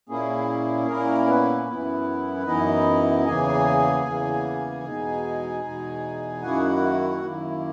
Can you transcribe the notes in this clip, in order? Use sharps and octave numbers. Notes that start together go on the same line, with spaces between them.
A#2 A#3 C#4 E4 G#4
A#2 A#3 C#4 E4 A#4
B3 B4
F#2 E3 B3 E4
F#2 E3 B3 D#4 E4 D#5
E2 C#3 E3 A#3 G#4 G#5
E2 C#3 E3 A#3
E2 B2 G#3 D#4
E2 B2 G#3 D#4
F#2 D#3 A#3 E4 F#4 F#5
F#2 D#3 A#3 E4